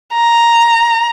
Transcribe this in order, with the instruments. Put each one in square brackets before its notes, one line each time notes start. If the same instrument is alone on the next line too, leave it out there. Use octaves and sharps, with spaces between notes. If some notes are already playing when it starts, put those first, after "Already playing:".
[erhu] A#5